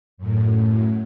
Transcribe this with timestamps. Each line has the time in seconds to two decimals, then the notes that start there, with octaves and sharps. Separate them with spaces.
0.18 F#2 A2